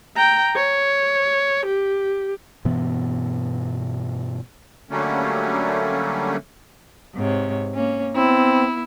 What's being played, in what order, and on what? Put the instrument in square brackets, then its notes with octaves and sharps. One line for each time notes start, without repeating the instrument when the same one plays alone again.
[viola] G5 A#5
C#5
G4
[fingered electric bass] G2 B2 E3 B3
[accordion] D3 F#3 G3 A3 A#3 C#4
[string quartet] G#2 C3 C#5
A#3 C#4
[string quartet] B3 E4 [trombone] C4